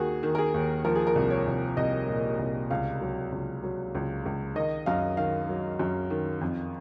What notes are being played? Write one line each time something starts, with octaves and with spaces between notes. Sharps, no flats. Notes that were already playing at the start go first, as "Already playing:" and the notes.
Already playing: D#2 D#3 F#4 G#4
D#3
A#4
G#4
D#2
F3 A#4
G#4
A#4
C2
C#5
C2
C2 D#5
A#2
C2
C#2 F5
F#3
C#2
F#3
C#2
C#2
D#3 D#5
F#2 F5
D#3 F5
F#3
F#2
D#3
F2